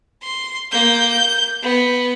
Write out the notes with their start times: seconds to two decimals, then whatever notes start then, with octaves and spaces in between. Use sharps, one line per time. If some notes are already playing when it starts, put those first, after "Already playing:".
0.22 C6
0.72 A#3 G6
1.11 G6
1.62 B3